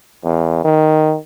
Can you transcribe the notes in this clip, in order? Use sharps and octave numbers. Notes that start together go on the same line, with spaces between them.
E2
D#3